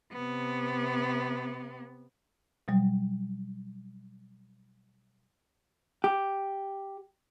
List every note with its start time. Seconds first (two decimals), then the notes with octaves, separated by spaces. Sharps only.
0.12 C3 B3
2.68 B2 F#3 G3
6.04 G4